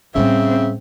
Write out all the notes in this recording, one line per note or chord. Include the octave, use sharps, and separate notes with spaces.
A2 C#3 G3 C4 E5